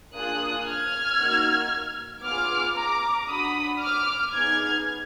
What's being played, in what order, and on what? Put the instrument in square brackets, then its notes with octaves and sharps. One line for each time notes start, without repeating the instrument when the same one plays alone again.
[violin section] A#3 D4 F4 G#4 D#6 F#6
F6 G#6
A#3 D#4 F#4
B3 F4 G#4 D6 F6
A#5 D6
D4 F#4 B5 D#6
D6 F6
B3 D#4 G#4 F6 G#6